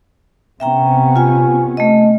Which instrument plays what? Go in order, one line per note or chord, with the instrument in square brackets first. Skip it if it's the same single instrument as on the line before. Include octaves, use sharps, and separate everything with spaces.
[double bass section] C3 B3 C#4 [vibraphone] E5 G5 A#5
[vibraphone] F4 G#5
A3 D#5